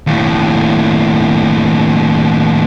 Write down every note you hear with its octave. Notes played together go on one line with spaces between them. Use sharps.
D#2 A2